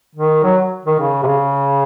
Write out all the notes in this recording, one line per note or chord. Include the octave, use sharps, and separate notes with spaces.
D#3
F#3
D#3
C#3
C3
C#3